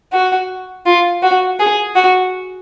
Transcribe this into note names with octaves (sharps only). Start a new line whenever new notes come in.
F#4
F4
F#4
G#4
F#4